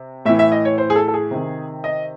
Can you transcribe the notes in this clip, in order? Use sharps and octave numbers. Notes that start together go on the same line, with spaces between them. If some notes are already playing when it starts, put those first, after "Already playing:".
Already playing: C3
A2 E3 E5
E5
D#5
C#5
C5
G#4
A4
A4
G#4
C3 D#3
D#5